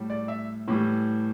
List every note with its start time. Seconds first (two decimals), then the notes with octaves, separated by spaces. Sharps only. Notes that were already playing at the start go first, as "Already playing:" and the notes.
Already playing: A2 G3
0.10 D5
0.28 E5
0.68 A2 E3 G3